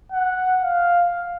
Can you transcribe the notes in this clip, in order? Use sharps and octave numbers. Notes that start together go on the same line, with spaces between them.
F#5
F5